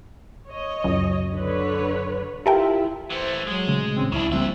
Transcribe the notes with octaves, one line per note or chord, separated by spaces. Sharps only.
C#5 D#5
C#2 F#2 F#3
D3 B4 C#5
E4 F4 G4 A4 A#4 E5 G5
E3 A3 C5
F#3 G#3
A#2 C#3 A3
A1 A#2 C4 C#4
D1 C#2 C#3 F#3 D4 E4
D3 F3 G3 A#3 C4 E5